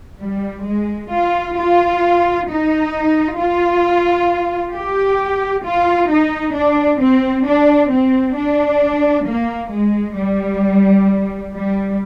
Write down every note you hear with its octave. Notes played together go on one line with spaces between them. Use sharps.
G3
G#3
F4
F4
D#4
F4
G4
F4
D#4
D4
C4
D4
C4
D4
A#3
G#3
G3
G3